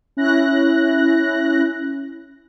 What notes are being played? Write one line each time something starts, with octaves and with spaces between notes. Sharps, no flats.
C#4 E4 F#6 A#6